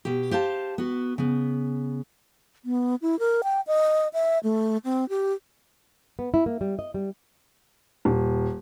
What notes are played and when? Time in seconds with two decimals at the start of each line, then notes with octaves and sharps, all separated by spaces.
0.05 B2 G4
0.31 G4 C5 F5 A5
0.78 B3 F#4
1.18 C#3 B3
2.65 B3
3.02 E4
3.19 A#4
3.44 G5
3.67 D#5
4.13 E5
4.43 A3
4.85 C4
5.09 G4
6.19 B3
6.34 E4
6.46 A#3
6.61 G3
6.79 D#5
6.94 G3
8.05 D#1